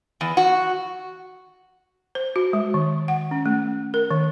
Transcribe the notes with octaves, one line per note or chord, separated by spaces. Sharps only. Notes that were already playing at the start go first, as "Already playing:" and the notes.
E2
F#4
C5
F#4
G#3
D#3
F#5
C#4
A3
A#4
D#3